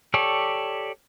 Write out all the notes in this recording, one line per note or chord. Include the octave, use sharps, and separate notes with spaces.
G4 A4 C#5 D5